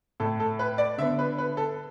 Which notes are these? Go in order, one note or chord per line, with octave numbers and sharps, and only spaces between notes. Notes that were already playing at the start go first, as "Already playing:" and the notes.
A2 A3 A4
A4
B4
D5
D3 B3 E5
B4
B4
A4